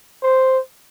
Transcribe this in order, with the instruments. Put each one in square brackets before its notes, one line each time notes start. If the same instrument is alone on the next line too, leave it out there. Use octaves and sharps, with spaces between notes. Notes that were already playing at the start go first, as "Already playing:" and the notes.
[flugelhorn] C5